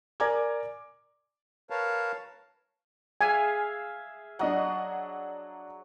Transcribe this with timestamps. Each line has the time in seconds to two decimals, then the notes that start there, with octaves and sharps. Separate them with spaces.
0.20 A#4 D5 G#5 A#5 D6 G#6
1.70 A#4 B4 C#5 F5 A5
3.21 G#4 E5 F5 G#5
4.39 F#3 D4 D#5 F#5